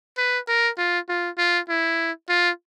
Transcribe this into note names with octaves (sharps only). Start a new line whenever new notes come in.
B4
A#4
F4
F4
F4
E4
F4